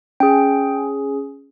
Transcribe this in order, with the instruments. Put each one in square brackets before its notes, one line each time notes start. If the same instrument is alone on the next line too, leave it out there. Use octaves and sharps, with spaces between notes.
[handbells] C#4 G#4 G5